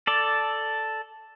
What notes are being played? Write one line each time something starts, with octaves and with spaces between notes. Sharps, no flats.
A4 D5